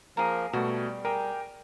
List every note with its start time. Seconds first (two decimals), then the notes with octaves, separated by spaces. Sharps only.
0.17 F3 A#3 G#4 A#4 A#5
0.53 B2 G3 A3 F#4
1.05 G4 G#4 A#4 G5